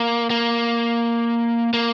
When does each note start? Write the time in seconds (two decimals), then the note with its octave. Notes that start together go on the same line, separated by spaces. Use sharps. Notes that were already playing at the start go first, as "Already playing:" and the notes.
Already playing: A#3
0.30 A#3
1.74 A#3